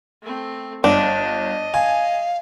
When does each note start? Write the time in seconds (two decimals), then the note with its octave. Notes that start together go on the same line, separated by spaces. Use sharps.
0.22 A3 C4
0.84 G1 D4 D#5
1.74 F5 G#5